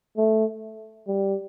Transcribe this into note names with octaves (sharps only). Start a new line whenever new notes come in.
A3
G3